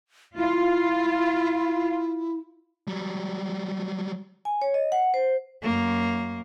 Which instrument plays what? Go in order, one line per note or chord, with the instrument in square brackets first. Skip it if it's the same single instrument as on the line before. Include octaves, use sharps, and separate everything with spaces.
[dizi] E4 [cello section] F4
[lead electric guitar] F#3 G3
[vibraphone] G#5
C#5
D#5
F#5
C5
[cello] F#2 A#3